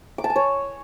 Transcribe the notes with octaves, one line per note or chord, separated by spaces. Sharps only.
D6
A5
G#5
C#5